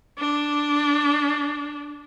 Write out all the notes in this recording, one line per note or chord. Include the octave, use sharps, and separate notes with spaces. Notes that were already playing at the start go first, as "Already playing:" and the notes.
D4